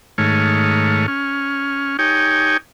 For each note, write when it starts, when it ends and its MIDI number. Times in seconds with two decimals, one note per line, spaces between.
0.18 1.06 44
0.18 1.06 51
0.18 1.06 57
0.18 1.06 73
0.18 1.06 89
1.08 1.97 61
1.08 1.97 89
1.99 2.57 63
1.99 2.57 67
1.99 2.57 73
1.99 2.57 79
1.99 2.57 80